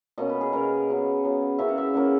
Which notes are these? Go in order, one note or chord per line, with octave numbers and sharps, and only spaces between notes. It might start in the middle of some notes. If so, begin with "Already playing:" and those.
B2 A#3 C#4 D#5
B4
G#4
B2 A#3 C#4 A#4
C#3 F#3 B3
C#3 F#3 B3
C#3 E3 A#3 C#4 E5
F#5
E5
C#3 E3 A#3 C#4 F#5